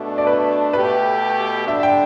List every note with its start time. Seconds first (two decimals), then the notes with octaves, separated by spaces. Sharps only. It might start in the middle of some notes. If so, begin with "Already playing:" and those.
Already playing: B2 A3 D4
0.18 D5
0.27 B4
0.73 B2 A3 G4 B4
1.68 D3 G3 D4 E5
1.83 G5